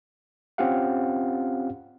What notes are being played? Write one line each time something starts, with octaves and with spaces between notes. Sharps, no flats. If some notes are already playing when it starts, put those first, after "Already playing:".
C4 C#4 F4 G4 F5 F#5